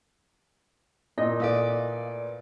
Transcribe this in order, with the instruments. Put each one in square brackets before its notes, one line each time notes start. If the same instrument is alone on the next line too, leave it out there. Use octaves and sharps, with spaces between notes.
[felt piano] A#2 [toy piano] E4 [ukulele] D#5
[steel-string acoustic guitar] A3 B4 D5 [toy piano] A4 F5 D#6